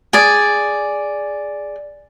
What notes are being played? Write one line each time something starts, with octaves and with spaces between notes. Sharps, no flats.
G#4 D5